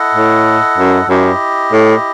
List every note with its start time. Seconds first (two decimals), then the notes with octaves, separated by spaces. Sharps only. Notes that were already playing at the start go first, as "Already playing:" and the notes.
Already playing: E4 A4 D#5 F#5
0.14 A2
0.78 F#2
1.09 F#2 E4 G4 D#5
1.72 A2